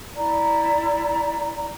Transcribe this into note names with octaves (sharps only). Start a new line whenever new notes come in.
E4 D5 A#5